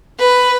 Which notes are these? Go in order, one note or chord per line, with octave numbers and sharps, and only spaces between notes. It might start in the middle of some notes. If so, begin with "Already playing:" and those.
B4